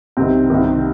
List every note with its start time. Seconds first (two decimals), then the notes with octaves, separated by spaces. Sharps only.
0.17 C2 C3 D#3 C4
0.50 C2 C3 D#3